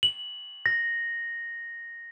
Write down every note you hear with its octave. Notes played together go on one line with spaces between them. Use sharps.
F#7
A#6